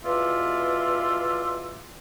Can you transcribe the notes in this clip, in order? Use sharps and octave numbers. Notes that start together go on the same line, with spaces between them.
E2 B2 F4 D5 E5